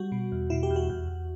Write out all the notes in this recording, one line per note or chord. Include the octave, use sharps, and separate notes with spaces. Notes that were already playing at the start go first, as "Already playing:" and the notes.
Already playing: G3 F#4
B2
E2
B2 E4
G4
E2
F#4
E2
E2